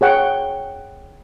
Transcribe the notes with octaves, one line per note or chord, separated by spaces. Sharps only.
G#4 C#5 F#5 G5